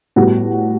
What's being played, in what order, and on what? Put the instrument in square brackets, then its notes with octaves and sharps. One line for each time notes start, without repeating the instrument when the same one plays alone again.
[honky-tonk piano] A2 G3 B3 F#4